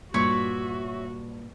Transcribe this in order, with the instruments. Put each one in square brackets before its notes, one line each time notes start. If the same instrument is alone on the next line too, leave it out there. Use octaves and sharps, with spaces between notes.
[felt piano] G2 [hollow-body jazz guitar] A#2 [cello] F#4 [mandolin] C#5 D5 E5